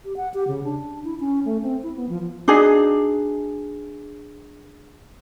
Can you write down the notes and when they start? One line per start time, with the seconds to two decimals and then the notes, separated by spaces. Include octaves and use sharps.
0.05 G4
0.17 F#5
0.34 G4
0.48 C#3
0.64 D4
1.04 E4
1.20 C#4
1.45 A3
1.62 C4
1.83 E4
1.96 B3
2.09 F3
2.48 D4 D#4 F#4 G#4